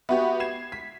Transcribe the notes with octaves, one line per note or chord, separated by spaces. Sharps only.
B3 F#4 G4 E5
G#6 C7 E7
B6